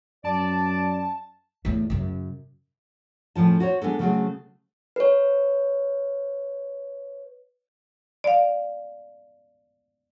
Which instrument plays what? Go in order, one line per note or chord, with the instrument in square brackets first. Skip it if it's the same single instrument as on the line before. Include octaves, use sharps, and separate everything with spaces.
[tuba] F#2 [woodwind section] D5 [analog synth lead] A5
[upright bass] E2 A2
F#2 C#3
[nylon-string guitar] A2 C#3 F3 A5
F#4 C5 C#5
G#3 B3 D4 A4
C#3 F#3 A3 C4 F#4 G#4
[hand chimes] B4 C#5
[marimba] D5 F5